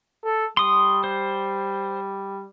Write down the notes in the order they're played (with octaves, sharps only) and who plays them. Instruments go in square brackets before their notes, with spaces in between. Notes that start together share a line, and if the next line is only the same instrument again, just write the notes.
[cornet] A4
[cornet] G3 [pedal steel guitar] C6 D#6
[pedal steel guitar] C5